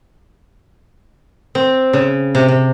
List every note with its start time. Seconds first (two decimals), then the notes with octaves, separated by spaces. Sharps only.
1.55 C4
1.93 C#3
2.35 C3
2.48 C3